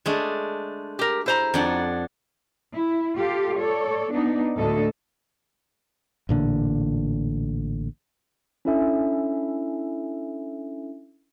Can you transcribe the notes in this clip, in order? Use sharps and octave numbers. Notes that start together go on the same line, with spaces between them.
G#3 A3 D4
G4 A#4
E4 C5 A#5
F2 D4 F#5
E4
F4 G4 A4 F5
A4 C#5 D5
B3 D4 D#4
D2 A2 A4 D#5
A1 A#2 D3
C#4 D4 E4 A4 E5 G#5